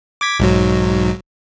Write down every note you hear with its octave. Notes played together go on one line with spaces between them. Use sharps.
D6 G#6 B6
B1 G#2 F#3